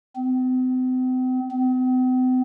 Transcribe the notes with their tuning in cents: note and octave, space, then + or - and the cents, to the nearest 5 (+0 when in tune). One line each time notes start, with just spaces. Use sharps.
C4 -40
C4 -45